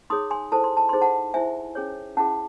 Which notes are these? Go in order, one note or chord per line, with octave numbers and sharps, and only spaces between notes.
D#4 G#4 C#5 C6 D#6
G#5 C6
E4 A4 C5 A5
C6
A5
D#4 G#4 C5 C6
F#5 A5
E4 C5 E5 G#5
C#4 G#4 C#5
C#4 E4 G#4 F#5 A5